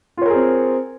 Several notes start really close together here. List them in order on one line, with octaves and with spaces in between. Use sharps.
F4 C#5 A#4 G#4 C4